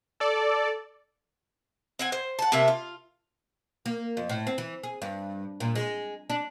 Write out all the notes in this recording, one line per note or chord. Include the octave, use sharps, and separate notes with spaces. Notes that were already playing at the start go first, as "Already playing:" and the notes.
A4 D5
C4 F#5 G#5
C5
F#5 A5
C3 A3 A#3 E5
F4
A#3
F2
A2
C4
E3
G#4
G2
A#2
G#3
D4